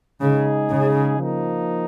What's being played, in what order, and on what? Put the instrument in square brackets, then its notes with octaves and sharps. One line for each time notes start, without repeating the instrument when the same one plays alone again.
[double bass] C#3 [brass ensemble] G#3 D#4 G#4
[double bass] C#3
[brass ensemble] F3 A#3 D#4